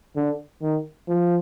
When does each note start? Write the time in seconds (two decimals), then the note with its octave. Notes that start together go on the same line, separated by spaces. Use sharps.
0.16 D3
0.62 D#3
1.09 F3